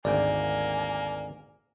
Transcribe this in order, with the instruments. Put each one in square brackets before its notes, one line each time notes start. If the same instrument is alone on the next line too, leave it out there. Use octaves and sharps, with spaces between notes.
[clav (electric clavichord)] G#1 D2 G5 [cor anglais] A#3 [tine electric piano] D5 [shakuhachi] G#5